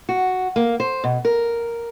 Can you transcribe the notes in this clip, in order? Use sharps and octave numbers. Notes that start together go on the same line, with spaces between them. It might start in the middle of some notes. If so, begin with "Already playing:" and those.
F#4
A#3
C5
B2
A#4